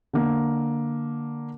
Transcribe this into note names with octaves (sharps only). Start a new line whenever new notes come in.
D3 A#3